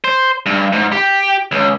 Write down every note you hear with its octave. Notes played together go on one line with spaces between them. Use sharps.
C5
G2
G#2
G4
C#2